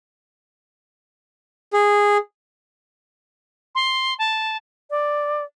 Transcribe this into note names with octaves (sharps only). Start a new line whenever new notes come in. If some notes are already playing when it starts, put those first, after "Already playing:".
G#4
C6
A5
D5